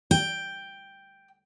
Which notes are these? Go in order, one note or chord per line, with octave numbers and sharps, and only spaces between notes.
G5